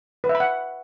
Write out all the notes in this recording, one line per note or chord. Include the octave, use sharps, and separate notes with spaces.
B4
E5
B5
F#5